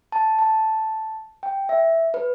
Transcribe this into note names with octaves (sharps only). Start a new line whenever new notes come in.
A5
A5
G5
E5
B4